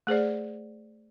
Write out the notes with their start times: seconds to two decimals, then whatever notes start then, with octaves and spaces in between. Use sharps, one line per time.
0.07 A3 G#4 C5 D5